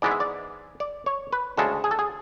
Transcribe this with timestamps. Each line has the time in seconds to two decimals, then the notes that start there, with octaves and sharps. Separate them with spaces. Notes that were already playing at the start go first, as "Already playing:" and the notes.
0.02 G#2 E3 G#3 B3 D5
0.11 E5
0.20 D5
0.80 D5
1.06 C#5
1.33 B4
1.57 D2 C#3 G#3 A4
1.84 G#4
1.91 A4
1.99 G#4